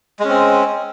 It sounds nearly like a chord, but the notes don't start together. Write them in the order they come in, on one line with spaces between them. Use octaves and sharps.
G#3 C#4 C4